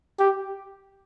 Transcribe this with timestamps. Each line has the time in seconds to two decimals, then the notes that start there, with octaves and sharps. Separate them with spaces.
0.19 G4